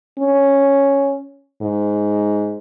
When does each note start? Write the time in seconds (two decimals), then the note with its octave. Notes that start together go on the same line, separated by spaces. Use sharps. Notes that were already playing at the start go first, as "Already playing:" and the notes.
0.19 C#4
1.62 G#2